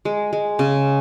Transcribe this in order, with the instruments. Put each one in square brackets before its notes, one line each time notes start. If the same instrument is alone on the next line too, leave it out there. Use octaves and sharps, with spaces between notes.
[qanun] G#3
G#3
C#3